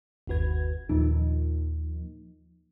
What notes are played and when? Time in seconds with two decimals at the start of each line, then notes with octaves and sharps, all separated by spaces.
0.27 G1 D#2 F#4 B4 G#6
0.89 D#2 A#2 F3 A#3 D#4